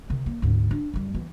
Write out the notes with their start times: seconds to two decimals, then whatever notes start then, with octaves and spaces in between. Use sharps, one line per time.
0.10 C3 D#3
0.26 A#3
0.42 D2 G#2
0.71 D4
0.94 F#2 G3
1.15 E3 B3